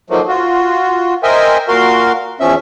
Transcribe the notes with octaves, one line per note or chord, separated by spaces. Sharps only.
D#3 F3 F#3 A3 A#3
F4 F#4
A#4 C5 D#5 E5 G5 G#5
A#2 F#4 A#4 F5 C6
E2 F3 C#4 E5